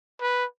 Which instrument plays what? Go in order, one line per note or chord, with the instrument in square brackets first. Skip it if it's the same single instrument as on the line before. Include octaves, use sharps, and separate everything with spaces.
[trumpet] B4